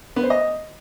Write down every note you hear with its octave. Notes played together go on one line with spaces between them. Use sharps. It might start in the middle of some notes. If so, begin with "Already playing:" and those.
B3
C5
D#5